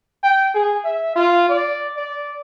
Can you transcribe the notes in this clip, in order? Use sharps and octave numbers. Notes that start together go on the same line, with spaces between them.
G5
G#4
E5
F4
D5
D5